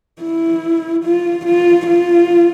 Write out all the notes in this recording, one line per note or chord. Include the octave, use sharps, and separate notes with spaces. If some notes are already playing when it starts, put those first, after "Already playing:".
E4
F4
F4
F4